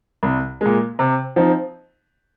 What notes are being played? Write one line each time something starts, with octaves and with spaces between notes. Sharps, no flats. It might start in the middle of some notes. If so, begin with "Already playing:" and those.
C2
A#2 G#3
C3
F3 C4 D#4